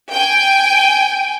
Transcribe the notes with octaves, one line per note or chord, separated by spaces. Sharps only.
G5 G#5